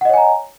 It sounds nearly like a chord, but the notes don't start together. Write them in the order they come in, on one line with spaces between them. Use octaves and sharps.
F#5 D#5 C#5 G#5 A#5